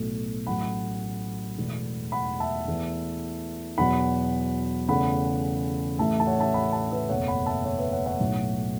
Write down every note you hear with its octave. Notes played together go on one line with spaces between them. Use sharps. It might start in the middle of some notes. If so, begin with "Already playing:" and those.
Already playing: B1 A2 F#3 A3
A1 A2 F#3 A3 F#5 B5
E1 E2 B2 A3
F#5 B5
E5 A5
E2 E3 A3
E2 B2 F#3 F#5 B5
E2 C#3 A3 F#5 B5
A1 A2 E3 A3 E5 A5
A5
C#5 F#5
E5 A5
F#5 B5
E5 A5
B4 E5
F#1 E2 B2 A3 C#5 F#5
F#5 B5
E5 A5
C#5 F#5
B4 E5
C#5 F#5
C#5 F#5
B1 A2 F#3